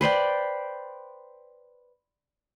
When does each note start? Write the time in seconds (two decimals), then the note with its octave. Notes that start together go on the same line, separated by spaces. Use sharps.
0.01 B4 C5 D5 G5